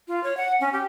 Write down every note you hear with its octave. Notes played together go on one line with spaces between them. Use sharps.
F4
C#5
F#5
C#4
G4